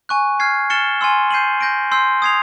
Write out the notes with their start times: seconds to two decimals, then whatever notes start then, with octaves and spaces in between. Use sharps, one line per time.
0.09 G#5 C#6 F#6
0.40 F6 G#6 C7
0.70 F6 A6 C#7 E7 G7
1.01 G#5 C6 E6
1.31 G6 C7 D#7 F#7
1.61 G6 A#6 D7
1.91 C6 E6 G6 C7
2.22 D#6 G#6 C7 F7